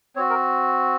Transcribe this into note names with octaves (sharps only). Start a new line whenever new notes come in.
C4 F#4 C#5
A#4